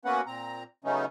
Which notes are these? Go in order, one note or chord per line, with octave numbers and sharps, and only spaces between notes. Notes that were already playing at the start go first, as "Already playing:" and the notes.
A#3 B3 C#4 F#4 B4 F#5
A#2 C4 A#5
C#3 F#3 A3 B3 C#4 D#4